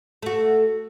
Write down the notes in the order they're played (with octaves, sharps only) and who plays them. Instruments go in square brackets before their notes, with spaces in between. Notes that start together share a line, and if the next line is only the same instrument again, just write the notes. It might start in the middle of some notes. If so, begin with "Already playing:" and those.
[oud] A3 F#4